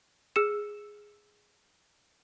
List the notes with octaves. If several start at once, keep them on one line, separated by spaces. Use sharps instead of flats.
G#4 E6 F6 C#7 E7